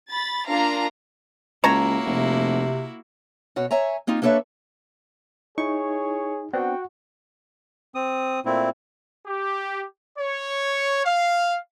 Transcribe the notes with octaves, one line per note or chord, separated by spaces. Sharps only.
B5 A6
A#3 D4 F4 F5 A#5
C#2 A#3 E4 F#4 C#5 A5 A#5
F1 C3
B2 F#4 C#5
C#5 E5 G#5 A#5
A#3 C4 D#4 F4
A#3 D4 A4 B4 C#5 E5
D#4 E4 G#4 C#5 C#6
B3 C4 D4 F#4 F#5 G5
C4 D#6
A#2 A3 C4 E4
G4
C#5
F5